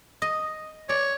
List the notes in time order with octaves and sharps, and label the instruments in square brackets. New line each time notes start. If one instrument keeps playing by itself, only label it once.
[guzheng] D#5
[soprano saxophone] C#5 [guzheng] D5